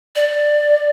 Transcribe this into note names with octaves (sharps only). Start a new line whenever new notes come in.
D5